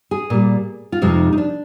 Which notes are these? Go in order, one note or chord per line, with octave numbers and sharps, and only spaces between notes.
G#4
A#2 G3
F4
F2 C3 F3 G#3 D#4
D#4
D4